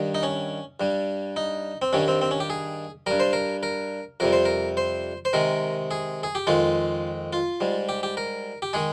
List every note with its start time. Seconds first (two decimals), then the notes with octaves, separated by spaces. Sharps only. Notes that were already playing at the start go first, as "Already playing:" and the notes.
Already playing: G2 D#3 G3
0.15 D#4
0.23 C#4
0.80 G2 G3
1.36 D#4
1.82 C4
1.93 G2 D#3 G3 C#4
2.08 C4
2.22 C4
2.31 C#4
2.40 G4
2.50 G#4
3.06 G2 G3 A#4
3.20 C5
3.33 A#4
3.63 A#4
4.20 F2 C3 G3 A#4
4.33 C5
4.45 A#4
4.77 C5
5.25 C5
5.33 C3 D#3 G#3 A#4
5.91 G#4
6.23 G#4
6.35 G4
6.47 F2 D#3 G#3 F4
7.33 F4
7.61 G#2 G3
7.89 G4
8.03 G4
8.17 A#4
8.62 G4
8.73 D#3 G#3 G#4